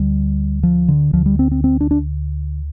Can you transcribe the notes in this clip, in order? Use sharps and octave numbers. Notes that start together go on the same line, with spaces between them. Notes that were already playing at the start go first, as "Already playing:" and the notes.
Already playing: D2 D3 G3
F3
D3
D2 D3 F3
G3
C4
C4
C4
D4
D4